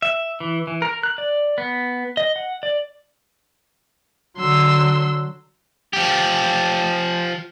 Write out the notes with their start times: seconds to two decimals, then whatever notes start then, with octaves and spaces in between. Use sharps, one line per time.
0.02 E5
0.40 E3
0.67 E3
0.82 A#4
1.03 F#6
1.18 D5
1.58 B3
2.17 D#5
2.36 F#5
2.63 D5
4.38 D3 F#3 C6 E6
5.93 F3 G4